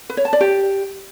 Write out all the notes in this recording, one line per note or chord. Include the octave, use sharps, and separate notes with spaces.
B4
C#5
A5
D5
G4